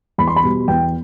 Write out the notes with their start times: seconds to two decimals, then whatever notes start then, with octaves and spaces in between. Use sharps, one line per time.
0.18 E2 B5
0.28 C6
0.36 B5
0.43 B2 G3
0.68 E2 G5